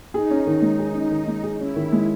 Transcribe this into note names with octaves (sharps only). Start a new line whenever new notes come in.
D#4 G#4
C#4
D#3
G#3
G#4
C#4
D#3
G#3
G#4
C#4 E4
D#3
G#3